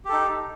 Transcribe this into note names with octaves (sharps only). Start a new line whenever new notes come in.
D#4 G4 A4